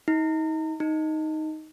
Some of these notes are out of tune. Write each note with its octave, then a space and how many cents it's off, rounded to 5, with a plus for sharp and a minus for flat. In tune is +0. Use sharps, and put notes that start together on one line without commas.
D#4 +35
D#4 +5